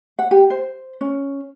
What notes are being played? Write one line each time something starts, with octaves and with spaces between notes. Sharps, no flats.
F#5
G4
C5
C#4